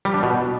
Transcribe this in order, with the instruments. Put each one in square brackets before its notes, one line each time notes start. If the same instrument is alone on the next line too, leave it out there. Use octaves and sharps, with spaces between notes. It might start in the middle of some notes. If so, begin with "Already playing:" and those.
[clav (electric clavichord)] G3
D4
B2